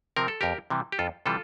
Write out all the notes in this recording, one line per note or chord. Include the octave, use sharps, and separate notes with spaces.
C3 F3 C4 A#4
A4
F2 G4 A#4
C3 E3 G3
G4
F2 F4 A4
C3 E3 G3 F4 A4